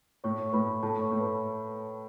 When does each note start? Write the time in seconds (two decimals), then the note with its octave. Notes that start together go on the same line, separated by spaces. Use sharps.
0.24 A2 C#5 C#6
0.49 C#6
0.53 A2 B4 B5
0.83 A2 A4 A5
1.01 C#5 C#6
1.11 A2
1.20 B4 B5